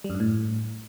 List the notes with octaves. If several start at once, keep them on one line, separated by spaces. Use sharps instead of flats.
G3
F#2
G2
A2